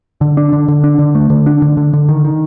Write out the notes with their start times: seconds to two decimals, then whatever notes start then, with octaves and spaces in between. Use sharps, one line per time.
0.21 D3
0.37 D4
0.53 D3
0.68 D3
0.84 D4
0.99 D3
1.15 A3
1.30 D3
1.46 D4
1.62 D3
1.77 D3
1.93 D3
2.09 D#3
2.25 D#3